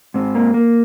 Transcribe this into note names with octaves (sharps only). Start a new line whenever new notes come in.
G#2 C4
A#3
A#3